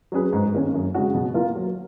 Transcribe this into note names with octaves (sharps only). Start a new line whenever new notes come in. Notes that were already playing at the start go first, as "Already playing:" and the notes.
F#3 C#4 G#4 B4
G#2
D#3 A#3 C#4
F#2
C#3 G#3 C#4 F#4
B2
A#3 F4 A#4
F#3